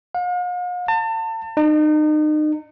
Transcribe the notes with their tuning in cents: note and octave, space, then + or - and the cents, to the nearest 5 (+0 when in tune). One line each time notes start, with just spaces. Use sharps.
F5 +45
A5 +35
D#4 -35